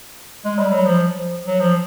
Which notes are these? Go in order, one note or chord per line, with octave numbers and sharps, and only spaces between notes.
G#3
G3
F#3
F3
F#3
F3